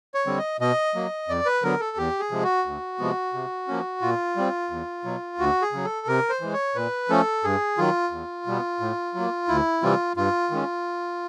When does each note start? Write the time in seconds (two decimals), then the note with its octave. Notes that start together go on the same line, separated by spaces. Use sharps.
0.14 C#5
0.27 D3 G3 C4
0.38 D#5
0.60 B2 D#5
0.95 F#3 A#3
1.28 F2 D5
1.46 B4
1.63 D3 F#3 B3 A#4
1.80 A4
1.97 E2 G4
2.20 G#4
2.31 C3 F3 G#3
2.43 F#4
2.66 D2
2.99 C3 F3 G#3 B3
3.34 C3
3.68 F3 A#3 C#4
4.01 A#2 F4
4.37 G3 C4
4.71 E2
5.05 B2 F#3
5.38 D2 F#4
5.62 G#4
5.72 C#3 F#3
5.84 A4
6.07 C3 A#4
6.29 C5
6.41 E3 G#3
6.53 C#5
6.75 A#2 B4
7.09 F3 A3 C#4 A4
7.44 G2 G#4
7.78 D#3 F#3 F4
8.11 E2
8.47 B2 G3 B3
8.80 A2
9.15 F#3 A#3
9.48 D2 E4
9.82 C3 E3 G3 C4 F4
10.17 G2 F4
10.51 D#3 G#3 C#4